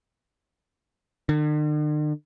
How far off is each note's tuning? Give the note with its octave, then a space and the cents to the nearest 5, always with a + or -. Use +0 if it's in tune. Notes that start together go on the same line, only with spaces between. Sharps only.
D3 +45